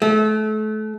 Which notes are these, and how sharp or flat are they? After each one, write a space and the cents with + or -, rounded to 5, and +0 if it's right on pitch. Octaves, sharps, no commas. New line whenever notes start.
A3 -30